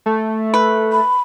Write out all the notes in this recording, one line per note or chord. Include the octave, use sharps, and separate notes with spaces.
A3
B4
B5